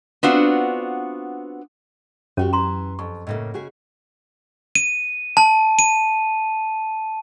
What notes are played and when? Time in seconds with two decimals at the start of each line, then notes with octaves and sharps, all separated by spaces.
0.23 B3 C4 D4 F4 F#4
2.37 F#2 C3 C#4 F#4 G4
2.53 E3 A#5 C6
2.99 F2 C#6
3.27 A2 C#3 A#3 D#5 E5
3.54 C#3 F#4 G#4
4.75 D#7
5.37 A5
5.79 D#7